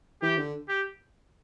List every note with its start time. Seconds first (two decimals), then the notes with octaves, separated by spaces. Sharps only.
0.22 E3 G4
0.38 D3
0.69 G4